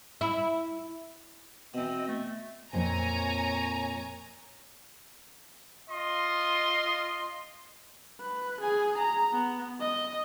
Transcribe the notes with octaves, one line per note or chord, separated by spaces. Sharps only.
E4
B2 E3 C4 D#5
A3
F2 A#2 C4 C#5 G#5 A#5
F4 D#5 C6
B4
G#4 G#5
A#5
B3
D#5